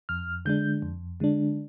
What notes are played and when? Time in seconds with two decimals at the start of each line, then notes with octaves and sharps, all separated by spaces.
0.09 F2 F6
0.45 D3 G#3 D4 G6
0.82 F2
1.20 D3 G#3 D4